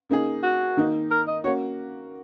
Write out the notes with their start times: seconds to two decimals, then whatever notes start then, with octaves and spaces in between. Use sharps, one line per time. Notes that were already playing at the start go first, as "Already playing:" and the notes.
0.09 C#3 A#3 D#4 G#4
0.43 F#4
0.77 D#3 A#3 D#4
1.11 A#4
1.28 D#5
1.44 A#3 C#4 F#4 C#5